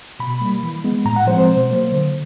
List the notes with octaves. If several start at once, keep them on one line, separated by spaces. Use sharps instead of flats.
B2 B5
G3 A#3
E3
G#3 B3
A2 A#5
F#5
F3 G#3 C4 C5
C5
B2
F#3 A#3
D3